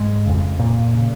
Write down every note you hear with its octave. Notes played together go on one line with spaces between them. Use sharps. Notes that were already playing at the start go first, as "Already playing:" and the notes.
Already playing: G#2 G#3
F2 C#3
A#2 A#3
C#3